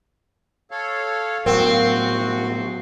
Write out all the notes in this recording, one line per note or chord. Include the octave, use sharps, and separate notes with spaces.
A4 C#5 F5
A2 F#3 B3 C4 F#4 A#4 F5